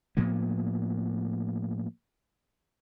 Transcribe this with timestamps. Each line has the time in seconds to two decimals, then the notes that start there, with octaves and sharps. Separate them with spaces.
0.17 A2 F3 A#3 B3